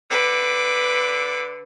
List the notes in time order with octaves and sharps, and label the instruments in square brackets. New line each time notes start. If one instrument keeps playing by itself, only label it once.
[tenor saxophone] D3 [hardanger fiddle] B4 D6